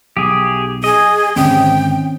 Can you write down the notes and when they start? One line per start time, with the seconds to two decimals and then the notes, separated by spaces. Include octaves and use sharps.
0.17 B1 G4 G#4
0.84 G#4 D#5
1.36 G#1 D3 D#3 C4 C#4 G5